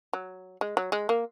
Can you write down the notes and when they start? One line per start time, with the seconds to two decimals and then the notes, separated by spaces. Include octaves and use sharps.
0.13 F#3
0.61 G#3
0.77 F#3
0.92 G#3
1.09 A#3